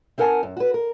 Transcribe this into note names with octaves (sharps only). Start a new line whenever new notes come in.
C4 D#4 A#4 F#5 G#5 A5
F#2
F#4 B4
A#4